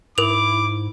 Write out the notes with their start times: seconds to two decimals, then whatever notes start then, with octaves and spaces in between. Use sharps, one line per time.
0.18 G#2 E4 A#4 D6 F7